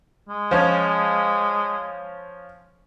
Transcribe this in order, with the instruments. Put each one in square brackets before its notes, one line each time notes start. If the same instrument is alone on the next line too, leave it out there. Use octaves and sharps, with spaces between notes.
[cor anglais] G#3
[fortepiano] F3 C#4